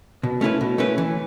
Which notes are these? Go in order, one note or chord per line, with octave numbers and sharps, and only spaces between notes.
B2
A3 C#4 E4 B4
B2
A3 C#4 E4 B4
E3